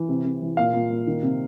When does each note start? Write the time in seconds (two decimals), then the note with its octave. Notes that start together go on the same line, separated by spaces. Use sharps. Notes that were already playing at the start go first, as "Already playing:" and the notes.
Already playing: E3
0.09 C3
0.25 C3
0.42 E3
0.57 A#2 F5
0.73 A#2
0.90 A#2
1.07 D#3
1.23 C3